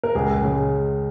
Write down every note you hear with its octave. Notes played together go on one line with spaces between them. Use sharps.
A#4
C#2 G#4
C#3 G#3